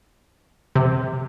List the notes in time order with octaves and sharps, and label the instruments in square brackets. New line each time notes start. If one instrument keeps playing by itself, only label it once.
[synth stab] C3